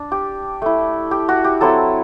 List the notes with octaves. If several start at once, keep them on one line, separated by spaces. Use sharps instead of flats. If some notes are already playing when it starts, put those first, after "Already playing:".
Already playing: D4
G4
A3 E4
G4
F#4
G4
F#3 C4 E4 A4